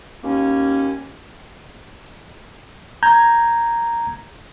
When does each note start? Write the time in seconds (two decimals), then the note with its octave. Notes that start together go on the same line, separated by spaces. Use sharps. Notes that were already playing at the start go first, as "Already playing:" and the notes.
0.24 D#2 A#3 C#4
3.03 A#5 G6 G#6